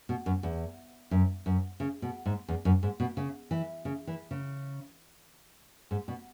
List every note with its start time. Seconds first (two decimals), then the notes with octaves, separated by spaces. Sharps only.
0.09 B2
0.26 F#2
0.43 E2
1.11 F#2
1.46 F#2
1.80 C#3
2.02 B2
2.26 G#2
2.48 E2
2.65 F#2
2.83 G#2
3.00 B2
3.17 C#3
3.51 E3
3.85 C#3
4.07 E3
4.31 C#3
5.91 G#2
6.08 B2